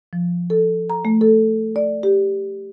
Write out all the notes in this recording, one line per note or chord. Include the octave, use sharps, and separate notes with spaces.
F3
A4
A#5
A3
A4
D5
G4